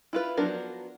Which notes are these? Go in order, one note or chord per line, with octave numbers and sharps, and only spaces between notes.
E4 F4 B4
F3 F#3 B3 D4 A#4